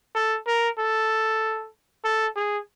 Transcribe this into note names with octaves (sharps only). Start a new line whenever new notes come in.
A4
A#4
A4
A4
G#4